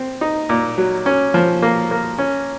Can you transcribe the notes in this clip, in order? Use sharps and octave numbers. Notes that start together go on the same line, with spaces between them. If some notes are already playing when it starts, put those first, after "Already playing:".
Already playing: C4
D#4
A#2
F#3
C#4
F3
A#3
A#3
C#4